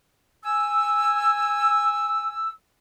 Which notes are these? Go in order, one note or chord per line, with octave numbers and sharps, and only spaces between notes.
G#5 E6